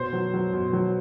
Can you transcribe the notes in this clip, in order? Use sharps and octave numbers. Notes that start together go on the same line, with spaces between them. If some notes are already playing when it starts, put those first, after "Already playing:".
Already playing: B2 C5
F#3
F#3
B2
F#3